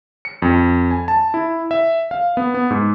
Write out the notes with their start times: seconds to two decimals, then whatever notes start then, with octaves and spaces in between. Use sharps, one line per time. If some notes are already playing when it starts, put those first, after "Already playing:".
0.25 C#7
0.42 F2
0.91 G#5
1.08 A5
1.34 E4
1.71 E5
2.11 F5
2.37 B3
2.54 B3
2.70 G#2